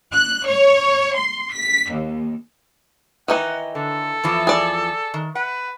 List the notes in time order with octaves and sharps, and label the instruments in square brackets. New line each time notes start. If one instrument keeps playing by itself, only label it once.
[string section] F#6
C#5
C6
B6
D#2
[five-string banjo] D#3 E3 D#4 [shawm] F#5
[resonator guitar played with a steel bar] D3 [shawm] A4
[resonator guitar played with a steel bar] E2 E3 F3
[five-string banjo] G#4 D5
[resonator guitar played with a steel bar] D#3
[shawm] B4 [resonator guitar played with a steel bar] F#5